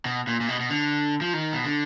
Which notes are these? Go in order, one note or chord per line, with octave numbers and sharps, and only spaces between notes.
B2
A#2
A#2
B2
B2
D3
F3
D#3
B2
D3